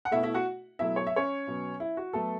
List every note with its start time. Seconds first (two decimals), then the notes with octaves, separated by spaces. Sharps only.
0.05 F#5
0.11 B2 A3 E4 E5
0.23 E4 E5
0.34 F#4 F#5
0.79 B2 F#3 A3 E4 E5
0.96 C#5
1.07 E5
1.16 C#4 C#5
1.47 B2 F#3 B3
1.80 E4
1.97 F#4
2.13 F#3 A3 B3 A4